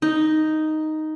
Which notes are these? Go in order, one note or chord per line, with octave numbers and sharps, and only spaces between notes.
D#4